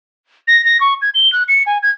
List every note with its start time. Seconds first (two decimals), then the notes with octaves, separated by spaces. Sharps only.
0.48 A#6
0.65 A#6
0.80 C#6
1.02 G#6
1.14 G7
1.32 F#6
1.48 C#7
1.66 G#5
1.82 G#6